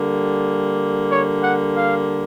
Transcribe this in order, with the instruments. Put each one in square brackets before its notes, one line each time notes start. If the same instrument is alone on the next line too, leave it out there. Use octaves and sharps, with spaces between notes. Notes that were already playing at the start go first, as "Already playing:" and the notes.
Already playing: [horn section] D3 G3 A#3
C#5
F#5
F5